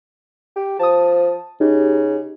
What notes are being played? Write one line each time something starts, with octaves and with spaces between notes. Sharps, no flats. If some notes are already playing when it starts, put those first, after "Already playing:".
G4
F3 A5 D#6
C#3 D#4 G4